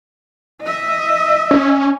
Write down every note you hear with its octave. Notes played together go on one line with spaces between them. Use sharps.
D#5 E5
C#4